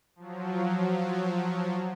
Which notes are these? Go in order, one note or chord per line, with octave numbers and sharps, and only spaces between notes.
F3 F#3